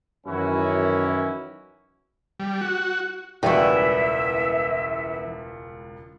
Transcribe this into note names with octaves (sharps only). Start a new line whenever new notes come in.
F#2 D#3 E3 C#4 E4 F#4
G3
F#4
E1 C#2 E3 G3 B3 E4 F#4 E5